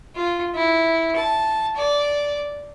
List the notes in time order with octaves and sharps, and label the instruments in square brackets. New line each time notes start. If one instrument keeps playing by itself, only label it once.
[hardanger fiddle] F4
E4
A5
D5